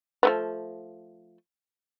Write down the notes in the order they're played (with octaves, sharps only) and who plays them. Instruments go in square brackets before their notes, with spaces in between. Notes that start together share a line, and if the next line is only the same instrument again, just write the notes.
[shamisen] F3 A3 B3